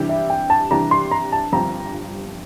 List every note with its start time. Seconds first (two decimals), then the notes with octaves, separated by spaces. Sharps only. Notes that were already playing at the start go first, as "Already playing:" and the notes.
Already playing: C3 E3 G3 D4 G4
0.09 E5
0.30 G5
0.50 A5
0.70 C3 E3 G3 D4 G4 A#5
0.91 C6
1.11 A#5
1.32 A5
1.52 G1 G2 F3 C4 G4 A#5